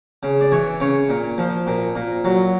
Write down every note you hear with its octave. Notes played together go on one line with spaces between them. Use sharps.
C#3
D5
E3 C#5
C#3 C#5
A#2
F3
A#2
A#2
F#3